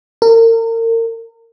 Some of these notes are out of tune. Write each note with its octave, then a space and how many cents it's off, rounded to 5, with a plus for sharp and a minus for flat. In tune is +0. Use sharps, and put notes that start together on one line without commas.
A#4 -35